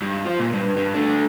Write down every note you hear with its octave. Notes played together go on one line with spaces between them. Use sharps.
G2
F4 C5
A#2
G2
G2
A3 D4